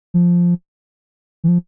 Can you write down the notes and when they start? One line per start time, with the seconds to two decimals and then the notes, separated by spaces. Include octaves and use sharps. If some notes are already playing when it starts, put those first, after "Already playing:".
0.14 F3
1.44 E3
1.48 F3